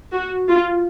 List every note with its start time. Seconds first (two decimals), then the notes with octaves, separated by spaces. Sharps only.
0.13 F#4
0.48 F4